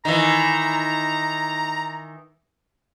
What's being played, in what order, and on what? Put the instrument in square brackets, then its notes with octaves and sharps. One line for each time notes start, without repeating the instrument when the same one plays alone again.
[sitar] D#3 E3 [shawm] A#5